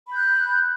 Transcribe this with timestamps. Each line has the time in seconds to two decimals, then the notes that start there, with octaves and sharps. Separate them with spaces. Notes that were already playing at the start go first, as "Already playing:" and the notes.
0.07 B5
0.12 G6
0.17 F#6